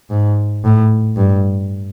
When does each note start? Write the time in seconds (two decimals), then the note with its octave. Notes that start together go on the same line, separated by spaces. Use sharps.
0.10 G#2
0.64 A2
1.16 G2